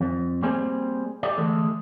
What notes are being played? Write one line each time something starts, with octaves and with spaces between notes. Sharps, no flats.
F2
G3 A#3 C4 G#4 C5 G#5
G4 D5
D3 E3 G#3 A3 A4